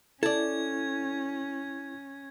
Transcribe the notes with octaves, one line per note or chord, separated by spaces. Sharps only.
C#4 E4 A4 D5 G#6